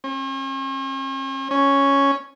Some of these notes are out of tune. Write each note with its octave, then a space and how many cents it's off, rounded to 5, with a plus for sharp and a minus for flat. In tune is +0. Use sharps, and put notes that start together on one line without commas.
C#4 -45
C#4 +0